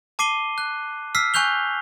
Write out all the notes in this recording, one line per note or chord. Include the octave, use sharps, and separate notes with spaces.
A5 D6 C7 D#7 G7
F#6
E6 F6 B6 C7
G#5 C#6 F#6 G6 F7 G7